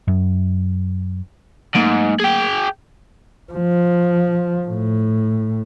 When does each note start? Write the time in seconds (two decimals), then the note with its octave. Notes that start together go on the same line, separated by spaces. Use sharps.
0.08 F#2
1.75 G#2 F#3 A3 A#3
2.20 G#4 G5
3.53 F3
4.67 A2